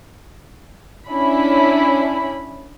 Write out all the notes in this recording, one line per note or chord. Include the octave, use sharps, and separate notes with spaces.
C#4 D4 E4 B5